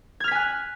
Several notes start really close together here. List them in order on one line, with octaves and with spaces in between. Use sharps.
G#6 F6 B6 G#5 F#6